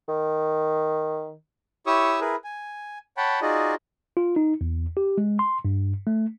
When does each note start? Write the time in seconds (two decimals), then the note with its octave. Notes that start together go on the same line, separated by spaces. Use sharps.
0.08 D#3
1.87 E4 G4 C#5 C#6 D#6 E6
2.21 E4 G#4 A#4 B4
2.44 G#5
3.17 C#5 F#5 G5 A5 B5
3.42 D#4 F4 F#4 G#4 D5 D#5
4.17 F4
4.36 D#4
4.61 E2
4.97 G4
5.18 G#3
5.39 C6
5.65 G2
6.07 A3